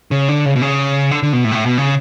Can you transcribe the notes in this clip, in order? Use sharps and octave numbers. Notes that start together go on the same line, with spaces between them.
C#3
D3
C#3
B2
C#3
D3
D3
B2
A2
B2
A2
B2
C#3